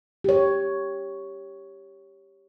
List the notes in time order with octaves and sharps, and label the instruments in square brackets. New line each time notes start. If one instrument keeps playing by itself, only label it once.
[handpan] G4 C#5